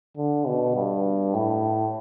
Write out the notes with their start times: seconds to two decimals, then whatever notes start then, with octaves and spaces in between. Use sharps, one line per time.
0.17 D3
0.47 B2
0.76 G2
1.34 A2